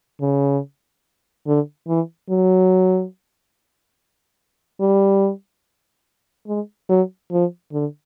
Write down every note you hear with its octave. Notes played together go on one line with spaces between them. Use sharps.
C#3
D3
E3
F#3
G3
G#3
F#3
F3
D3